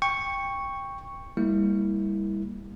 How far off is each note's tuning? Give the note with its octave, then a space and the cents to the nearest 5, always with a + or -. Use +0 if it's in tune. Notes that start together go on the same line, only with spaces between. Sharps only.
G5 +15 C#6 +0
G3 +35 A#3 +0 E4 -20